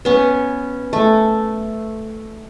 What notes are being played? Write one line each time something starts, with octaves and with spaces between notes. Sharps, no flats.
B3 C#4
A3